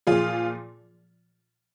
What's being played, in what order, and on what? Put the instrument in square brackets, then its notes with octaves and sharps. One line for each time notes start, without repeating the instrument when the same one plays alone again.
[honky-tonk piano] A#2 F3 F4 G#4